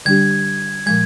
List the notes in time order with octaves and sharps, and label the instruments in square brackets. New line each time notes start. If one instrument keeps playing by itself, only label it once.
[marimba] D3 G3 D4 G4 [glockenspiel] G#6
[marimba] A#2 F3 G#3 [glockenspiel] G#6